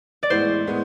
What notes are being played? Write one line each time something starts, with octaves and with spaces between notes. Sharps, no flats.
D5
A1 A2 G#3 B3 E4 C5
A2 G#3 B3 E4